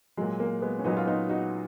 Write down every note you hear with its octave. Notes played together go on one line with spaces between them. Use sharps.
A#2 F#3 G#3
A#3
G#3 B3
C#4
A#2 F#3 B3 D#4
F4
B3 D#4
D#4 F#4